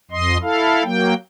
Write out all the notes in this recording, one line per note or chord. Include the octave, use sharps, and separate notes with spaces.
F2 D#5 C6
E4 A4 F5
F#3 A#3 G5